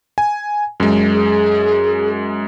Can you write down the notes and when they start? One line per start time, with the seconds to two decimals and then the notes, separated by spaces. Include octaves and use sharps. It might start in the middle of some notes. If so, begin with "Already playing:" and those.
0.18 G#5
0.80 F#2 G#3
1.13 G#4